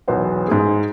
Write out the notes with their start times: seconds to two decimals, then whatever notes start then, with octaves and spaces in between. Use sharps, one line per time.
0.08 B1 E2 B3 C5 C#5 F#5
0.48 G#2 G#4